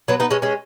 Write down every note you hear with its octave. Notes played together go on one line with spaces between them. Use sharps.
F#3 B3
B3 D#4
G#3 C#4
G#3 C#4